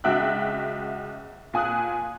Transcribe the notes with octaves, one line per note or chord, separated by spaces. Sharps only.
C#2 F#4 E5 G5 F#6
A#2 G#5 D#6 F#6